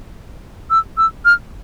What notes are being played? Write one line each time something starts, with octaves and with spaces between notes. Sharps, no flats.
E6
E6
F6